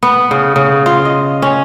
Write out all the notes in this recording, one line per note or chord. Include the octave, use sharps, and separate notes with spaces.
B3
C#3
C#3
F4
D#5
C#4